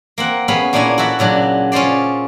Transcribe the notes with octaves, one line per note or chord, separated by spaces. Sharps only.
A#3 C4 F#5
B3 C#4 G#4 F5 B5
A#2 A#3 D4 E4 C#5 G#5
F#4 A4 C#5 E5 F#5
A#2 C#3 F#3 D4
C#4 F4 G#4 C5 D5